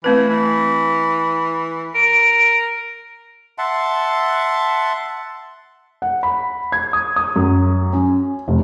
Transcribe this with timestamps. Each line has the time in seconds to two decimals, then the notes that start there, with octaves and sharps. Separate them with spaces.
0.04 E3 A3 C4 B4
0.30 E3
1.95 A#4 D7
3.58 E5 F#5 A5 C6
6.02 F#5
6.23 B5
6.72 G#6
6.93 D#6
7.16 D#6
7.36 F#2
7.93 C#4
8.48 F1